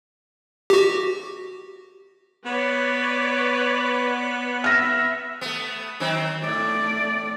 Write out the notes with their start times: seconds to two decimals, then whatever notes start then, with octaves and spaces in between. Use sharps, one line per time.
0.70 F#4 G4
2.46 B3 B4 C#5 D5
4.64 E5 F6 A#6
5.41 A3 B3
6.00 D#3 F#3 C4
6.44 A2 A3 D5